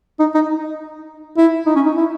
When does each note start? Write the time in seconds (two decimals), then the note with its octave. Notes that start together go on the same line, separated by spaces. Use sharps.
0.20 D#4
0.35 D#4
1.38 E4
1.66 D#4
1.76 C#4
1.86 D#4
1.96 E4